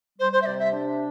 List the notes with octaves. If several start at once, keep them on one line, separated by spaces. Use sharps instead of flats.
G3 C5
C5
E5
C3 D5
E5
D4